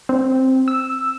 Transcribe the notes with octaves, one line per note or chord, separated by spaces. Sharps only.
C4
E6